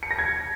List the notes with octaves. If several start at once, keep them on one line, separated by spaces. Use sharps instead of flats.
C#7
A#6
G#6